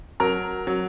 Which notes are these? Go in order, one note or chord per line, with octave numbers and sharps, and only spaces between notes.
F#3 A#4 A#5
F#3